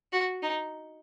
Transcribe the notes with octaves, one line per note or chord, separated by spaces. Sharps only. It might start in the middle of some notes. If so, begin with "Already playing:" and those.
F#4
D#4